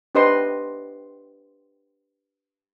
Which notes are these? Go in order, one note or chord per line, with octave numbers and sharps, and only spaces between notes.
D4 G4 B4 C5 D#5 C6